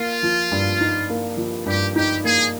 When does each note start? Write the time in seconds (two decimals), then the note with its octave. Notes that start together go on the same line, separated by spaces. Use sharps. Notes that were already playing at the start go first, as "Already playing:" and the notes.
Already playing: A#3 F4
0.23 F3
0.51 G2
0.81 D#4
1.10 A#3
1.37 F3
1.66 G2 G4
1.95 D#4 G4
2.24 A#3 G#4